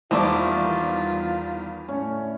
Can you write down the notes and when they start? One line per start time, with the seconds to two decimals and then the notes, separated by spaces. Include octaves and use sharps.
0.11 E2 D#3 F3 G3 A3 F4 B4 D5
1.88 A2 D3 C#4